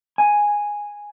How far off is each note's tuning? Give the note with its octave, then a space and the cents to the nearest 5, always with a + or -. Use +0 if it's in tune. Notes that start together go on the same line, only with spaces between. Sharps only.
G#5 -5